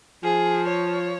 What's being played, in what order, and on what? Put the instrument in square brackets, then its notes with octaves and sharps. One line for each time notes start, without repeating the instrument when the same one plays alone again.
[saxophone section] F3 [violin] G#4
[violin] C#5